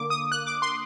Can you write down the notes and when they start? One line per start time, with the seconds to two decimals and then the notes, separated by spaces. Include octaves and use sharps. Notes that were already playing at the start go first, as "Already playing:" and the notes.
Already playing: D3 A#3 D6
0.10 D#6
0.32 F#6
0.47 D6
0.62 C6